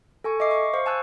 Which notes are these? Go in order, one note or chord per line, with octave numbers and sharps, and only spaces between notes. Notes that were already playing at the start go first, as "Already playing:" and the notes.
A4 G#5 C#6
D#5 E5 D6 C7
C#6
C5 F5 C#6
G#5 A5 E6 F#6